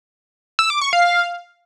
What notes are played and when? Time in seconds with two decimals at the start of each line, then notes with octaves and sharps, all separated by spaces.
0.59 E6
0.70 D6
0.81 C#6
0.93 F5